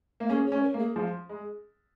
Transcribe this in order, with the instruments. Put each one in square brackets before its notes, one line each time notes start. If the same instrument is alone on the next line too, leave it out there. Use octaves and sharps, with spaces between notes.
[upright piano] A#3
[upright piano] C#4 [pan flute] G#4
[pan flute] C#5
[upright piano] C#4
[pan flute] A#4
[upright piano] A#3
[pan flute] G#4
[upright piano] F3
G#3